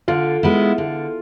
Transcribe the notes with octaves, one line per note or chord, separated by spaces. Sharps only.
D3 F4
G#3 B3 E4
D3